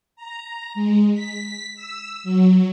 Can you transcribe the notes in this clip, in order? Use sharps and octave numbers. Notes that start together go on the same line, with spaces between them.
A#5
G#3
B6
E6
F#3